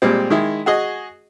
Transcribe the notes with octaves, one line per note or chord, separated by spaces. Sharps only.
A#2 G3 G#3 C4
D#3 G#3 E4
F#4 G#4 D#5